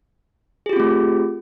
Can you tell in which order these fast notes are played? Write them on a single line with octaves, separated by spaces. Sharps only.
G#4 G4 F4 C4 A3